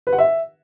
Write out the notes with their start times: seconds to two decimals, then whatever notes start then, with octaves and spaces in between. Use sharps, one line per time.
0.07 B4
0.13 F#5
0.18 E5